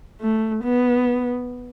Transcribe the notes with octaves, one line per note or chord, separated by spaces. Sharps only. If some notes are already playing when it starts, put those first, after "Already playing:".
A3
B3